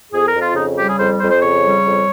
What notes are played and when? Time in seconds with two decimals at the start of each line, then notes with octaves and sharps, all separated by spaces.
0.12 F2 G#4
0.26 A#4
0.34 F2
0.41 F4
0.55 C#3 D#4
0.77 G3 G4
0.88 G#4
0.98 F2 C5
1.20 F2 C5
1.31 C5
1.41 C#3 C#5
1.63 G3
1.85 F2